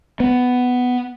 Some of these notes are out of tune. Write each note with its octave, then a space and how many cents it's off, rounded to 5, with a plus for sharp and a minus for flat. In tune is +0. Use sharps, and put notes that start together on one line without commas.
B3 +10